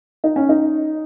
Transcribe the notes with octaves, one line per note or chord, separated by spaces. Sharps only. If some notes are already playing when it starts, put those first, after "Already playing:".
D#4
C#4
D#4